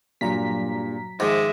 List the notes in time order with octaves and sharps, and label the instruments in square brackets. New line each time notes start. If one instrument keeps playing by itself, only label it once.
[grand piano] G2 A#2 [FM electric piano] F#3 A#5 B6
[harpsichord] G#2 D#3 F3 [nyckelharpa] G#3 E5 [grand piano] D6